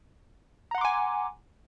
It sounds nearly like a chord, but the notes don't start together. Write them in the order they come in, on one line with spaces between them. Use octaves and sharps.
A#5 F#5 C6 D6 G#5